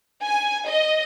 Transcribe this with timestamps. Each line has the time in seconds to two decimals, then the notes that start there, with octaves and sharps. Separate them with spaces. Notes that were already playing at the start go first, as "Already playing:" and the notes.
0.23 G#5
0.66 D#5